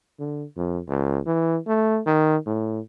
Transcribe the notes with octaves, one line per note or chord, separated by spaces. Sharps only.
D3
F2
C#2
E3
A3
D#3
A2